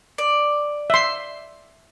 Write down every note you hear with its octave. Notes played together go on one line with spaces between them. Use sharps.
D5
E5 C6